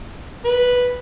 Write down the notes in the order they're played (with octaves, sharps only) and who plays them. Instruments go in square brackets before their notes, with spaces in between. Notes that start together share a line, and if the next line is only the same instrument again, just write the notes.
[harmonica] B4